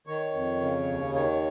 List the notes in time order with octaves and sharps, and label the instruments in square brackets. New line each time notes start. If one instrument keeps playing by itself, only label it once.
[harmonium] D#3 C#5
F2
C#3
D#2
D#3 C#5